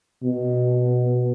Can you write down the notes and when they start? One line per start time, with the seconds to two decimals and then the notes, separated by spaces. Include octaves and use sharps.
0.23 B2